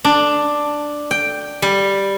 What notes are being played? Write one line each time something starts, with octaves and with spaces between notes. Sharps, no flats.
D4
G5
G3